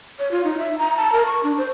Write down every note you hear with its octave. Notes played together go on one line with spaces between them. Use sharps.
C#5
F4
D#4
E5
A#5
A5
A#4
C#6
D4
C5